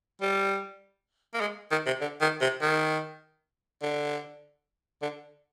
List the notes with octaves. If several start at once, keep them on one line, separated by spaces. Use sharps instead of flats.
G3
A#3
G#3
D#3
C3
D3
D#3
C3
D#3
D3
D3